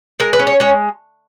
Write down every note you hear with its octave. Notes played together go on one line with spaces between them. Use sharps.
G#3 A#4
B4
C#4
C#5
G#3 C#5